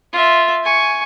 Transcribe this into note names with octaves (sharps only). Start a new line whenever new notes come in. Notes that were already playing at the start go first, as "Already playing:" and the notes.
F4 E5
G#5 C#6